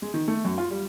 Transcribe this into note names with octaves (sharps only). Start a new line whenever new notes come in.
G#3
D#3
A3
F#2
F4
G3